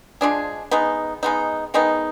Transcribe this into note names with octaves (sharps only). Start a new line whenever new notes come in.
F3 G#3 D4 G#4
G#3 B3 D#4
G#3 B3 D#4
D#3 G#3 B3 D#4